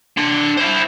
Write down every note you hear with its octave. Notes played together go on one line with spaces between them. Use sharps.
D4 C6
E4 C5